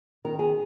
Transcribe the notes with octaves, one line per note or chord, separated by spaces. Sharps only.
D#3 A#4
G#4